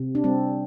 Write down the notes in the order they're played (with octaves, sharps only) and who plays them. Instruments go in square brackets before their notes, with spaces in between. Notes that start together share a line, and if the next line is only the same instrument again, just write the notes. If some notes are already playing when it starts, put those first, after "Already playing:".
Already playing: [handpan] C3
D4
G3 C4